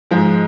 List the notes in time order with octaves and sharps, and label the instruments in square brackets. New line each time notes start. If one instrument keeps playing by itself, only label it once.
[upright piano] G#2 F3 G#3